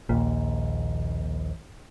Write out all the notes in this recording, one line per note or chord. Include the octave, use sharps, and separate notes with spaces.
A#1 D#2 A#2